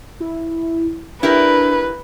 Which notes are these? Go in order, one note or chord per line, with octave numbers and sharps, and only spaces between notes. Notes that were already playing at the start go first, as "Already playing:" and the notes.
E4
D4 E4 G4 A#4 B4